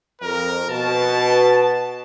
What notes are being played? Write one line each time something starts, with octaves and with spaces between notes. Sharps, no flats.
F2 A#4
B2 A5